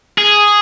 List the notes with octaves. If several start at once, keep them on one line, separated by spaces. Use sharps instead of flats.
G#4